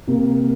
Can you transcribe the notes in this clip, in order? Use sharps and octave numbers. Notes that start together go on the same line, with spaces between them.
C3 A#3